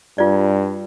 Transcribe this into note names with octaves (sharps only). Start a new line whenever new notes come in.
G2 F4 D5